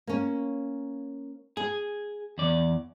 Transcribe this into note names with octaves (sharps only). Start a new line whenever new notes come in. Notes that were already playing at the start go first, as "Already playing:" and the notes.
A#3 C#4
G#4 G#5
E2 D5